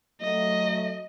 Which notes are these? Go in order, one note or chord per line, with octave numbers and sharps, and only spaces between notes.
F#3 A3 D#5